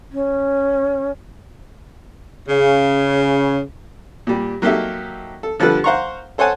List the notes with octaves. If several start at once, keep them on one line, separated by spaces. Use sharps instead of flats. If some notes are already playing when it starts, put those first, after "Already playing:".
C#4
C#3
A#2 G3
F#3 A#3 D#4 G4 A4 E5
A4
D3 F3 G3 A4 B4
C5 F5 F#5 A#5 C6 C#6
A4 C5 C#5 F#5 G#5 A5